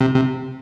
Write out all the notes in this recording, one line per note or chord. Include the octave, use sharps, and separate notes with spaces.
C3
C3